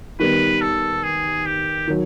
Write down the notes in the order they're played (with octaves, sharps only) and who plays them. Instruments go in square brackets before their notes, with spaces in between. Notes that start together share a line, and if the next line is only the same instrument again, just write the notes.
[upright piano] D#3 G3 B3 [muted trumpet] B4
[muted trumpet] A4
G#4
G4
[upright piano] D#3 F#3